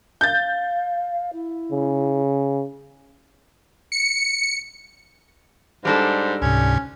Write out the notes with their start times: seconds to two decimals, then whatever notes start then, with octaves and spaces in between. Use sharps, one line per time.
0.21 F5 G6 A6
1.32 E4
1.72 C#3
3.92 C#7
5.85 G#2 G3 D4 A4
6.42 C#2 G#2 C3 C#4